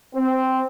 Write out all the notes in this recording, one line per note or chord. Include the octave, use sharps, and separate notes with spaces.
C4